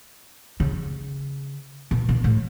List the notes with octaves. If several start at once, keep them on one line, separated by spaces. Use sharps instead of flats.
C#3
B2
B2
A2